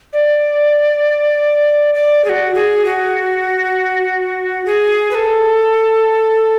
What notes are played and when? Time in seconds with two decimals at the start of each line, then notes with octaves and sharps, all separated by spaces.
0.13 D5
1.94 D5
2.25 G#4
2.29 F#4
2.55 G#4
2.85 F#4
4.66 G#4
5.11 B4
5.15 A4